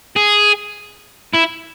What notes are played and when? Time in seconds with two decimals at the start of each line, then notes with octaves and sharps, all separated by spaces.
0.16 G#4
1.34 E4